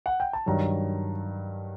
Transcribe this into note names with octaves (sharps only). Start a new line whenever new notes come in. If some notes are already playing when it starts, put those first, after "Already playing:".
F#5
G5
A5
G2 D#3 F#3 A#5